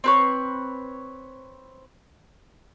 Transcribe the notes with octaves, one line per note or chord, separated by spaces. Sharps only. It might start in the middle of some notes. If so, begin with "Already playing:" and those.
C4 B4 C#5